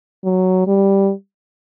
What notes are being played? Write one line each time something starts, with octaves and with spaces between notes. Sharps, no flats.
F#3
G3